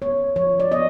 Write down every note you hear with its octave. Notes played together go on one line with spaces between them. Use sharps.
B3 C#5
F3 C#5
D5
B3 D#5